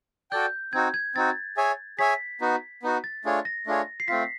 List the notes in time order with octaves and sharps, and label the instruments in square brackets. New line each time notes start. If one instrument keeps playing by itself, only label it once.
[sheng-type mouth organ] F#4 A4 D5 G5 [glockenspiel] G6
[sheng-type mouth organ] C4 D#4 F#4 [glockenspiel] G#6
[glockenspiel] G#6
[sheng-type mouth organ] C4 D#4 F#4 [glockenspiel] A6
[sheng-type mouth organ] G#4 C#5 E5 G#5
[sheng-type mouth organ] G#4 C#5 E5 G#5 [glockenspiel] B6
[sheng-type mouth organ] B3 D#4 F#4
B3 D#4 F#4
[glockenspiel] A6
[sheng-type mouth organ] A3 D4 F4 G#4 C#5
[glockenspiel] A#6
[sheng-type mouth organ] A3 D4 F4 G#4 C#5
[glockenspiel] C7
[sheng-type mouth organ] A3 C4 F4 [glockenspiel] B6